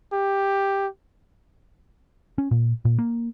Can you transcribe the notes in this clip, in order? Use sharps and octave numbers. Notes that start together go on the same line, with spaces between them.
G4
C#4
A#2
A#2
A#3